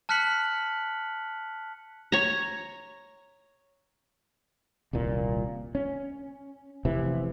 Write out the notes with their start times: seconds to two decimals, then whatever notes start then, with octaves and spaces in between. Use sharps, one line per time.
0.09 A5 F6 F#6 B6 C#7 F#7
2.12 C#5 A#5
4.93 D#1 C2 A#2
5.75 C#4
6.85 F1 C3 E3